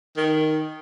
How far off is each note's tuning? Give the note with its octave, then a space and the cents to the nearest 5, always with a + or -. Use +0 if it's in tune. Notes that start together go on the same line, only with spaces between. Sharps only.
D#3 +0